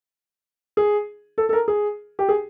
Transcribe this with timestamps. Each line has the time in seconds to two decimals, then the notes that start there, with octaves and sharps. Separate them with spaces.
0.77 G#4
1.38 A4
1.49 A4
1.53 A#4
1.68 G#4
2.19 G4
2.29 G#4